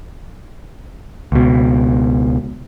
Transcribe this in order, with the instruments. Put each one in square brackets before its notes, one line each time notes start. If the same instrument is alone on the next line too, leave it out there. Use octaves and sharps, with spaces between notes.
[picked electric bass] C#2 B2